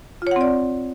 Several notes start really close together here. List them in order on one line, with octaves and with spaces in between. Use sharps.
F4 C#5 F#5 C4 D5